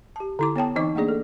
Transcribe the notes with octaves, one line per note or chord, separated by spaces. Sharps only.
G4 A5
D3 E4 D6
B3 C#5 G5 A5
E3 C4 D#4 D#5 C#6 D6
A3 A#3 D4 G#4 D5
A4